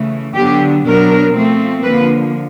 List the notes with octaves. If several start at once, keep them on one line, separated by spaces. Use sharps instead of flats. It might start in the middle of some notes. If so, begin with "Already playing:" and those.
Already playing: C#3 E3 A3
D3 F#3 B3 D4 G4
B2 F#3 B3 D4 A#4
F3 A3 C4
D3 F3 A#3 B4